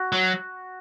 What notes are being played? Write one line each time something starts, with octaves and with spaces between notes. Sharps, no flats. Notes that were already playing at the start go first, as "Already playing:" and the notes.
Already playing: F#4
F#3